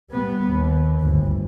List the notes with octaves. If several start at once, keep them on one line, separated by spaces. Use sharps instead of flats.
G3 B3
D#2
G1 D2